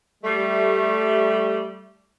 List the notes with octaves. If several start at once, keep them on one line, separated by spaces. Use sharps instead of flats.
G3 A3